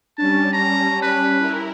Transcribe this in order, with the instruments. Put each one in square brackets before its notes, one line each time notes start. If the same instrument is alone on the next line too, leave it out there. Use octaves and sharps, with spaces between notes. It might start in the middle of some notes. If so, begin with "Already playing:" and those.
[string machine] G3 C#4 [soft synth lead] D4 [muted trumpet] A5
[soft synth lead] A5 [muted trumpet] A#5
[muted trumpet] B4
[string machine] E4 A#4